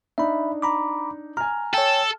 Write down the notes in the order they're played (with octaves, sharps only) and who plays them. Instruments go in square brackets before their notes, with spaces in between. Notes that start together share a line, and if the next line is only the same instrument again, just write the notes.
[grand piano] D4 D#4 [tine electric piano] E5 B5
[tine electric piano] A#5 B5 D6
[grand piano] G#5 F6 [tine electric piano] A#5
[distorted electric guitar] A4 [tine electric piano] C#5 G5